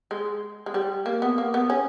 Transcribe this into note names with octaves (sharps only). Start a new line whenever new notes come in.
G#3
G#3
G3
A#3
B3
A#3
B3
C#4